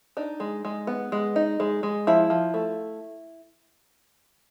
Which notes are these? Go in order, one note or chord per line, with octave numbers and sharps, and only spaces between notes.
D4 D#4
G#3
G#3
B3
G#3
D#4
G#3
G#3
F3 E4
F3
A3